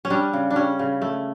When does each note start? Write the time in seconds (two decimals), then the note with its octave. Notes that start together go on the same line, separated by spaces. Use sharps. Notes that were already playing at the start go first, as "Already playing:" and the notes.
0.05 C#4
0.10 G3 D4
0.33 C#3
0.51 D4
0.56 G3 C#4
0.79 C#3
1.02 A3